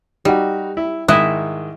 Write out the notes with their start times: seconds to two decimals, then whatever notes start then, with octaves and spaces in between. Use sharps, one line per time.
0.25 G3 D#4 F#4
0.77 E4
1.08 G#2 D#3 E4 D#5 E5 F#6